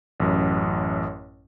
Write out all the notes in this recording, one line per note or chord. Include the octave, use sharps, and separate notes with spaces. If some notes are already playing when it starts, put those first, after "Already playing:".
A1 F#2